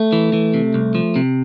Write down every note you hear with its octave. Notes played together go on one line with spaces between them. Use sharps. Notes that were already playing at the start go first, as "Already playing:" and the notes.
Already playing: A3
E3
E3
C3
C2
F3
C3